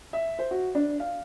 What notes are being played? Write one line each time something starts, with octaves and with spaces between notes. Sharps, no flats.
E5
C5
F#4
D4
F5